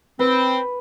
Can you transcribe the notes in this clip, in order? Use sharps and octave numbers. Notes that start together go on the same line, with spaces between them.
C4 B4